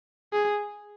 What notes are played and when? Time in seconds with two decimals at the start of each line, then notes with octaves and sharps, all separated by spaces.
0.33 G#4